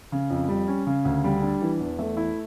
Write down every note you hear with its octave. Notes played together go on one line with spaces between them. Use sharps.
C#3
F2
G3
C#4
C#3
D2
G3
D4
E3
E2
A3
E4